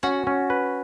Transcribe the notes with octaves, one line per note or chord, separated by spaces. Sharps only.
C#4 F#4
C#4
B4